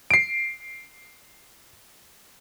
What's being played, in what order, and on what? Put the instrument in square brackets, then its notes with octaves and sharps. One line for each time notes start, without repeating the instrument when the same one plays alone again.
[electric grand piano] C7 D7